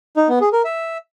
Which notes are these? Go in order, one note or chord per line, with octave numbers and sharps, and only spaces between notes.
D#4
B3
G#4
A#4
E5